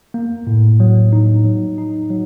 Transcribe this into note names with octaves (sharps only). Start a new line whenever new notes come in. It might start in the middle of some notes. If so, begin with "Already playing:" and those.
A#3
A2
F#3
D#4
F#3
D#4
F#3